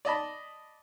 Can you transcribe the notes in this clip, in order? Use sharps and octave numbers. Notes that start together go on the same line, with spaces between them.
D5 D#5 A5 B5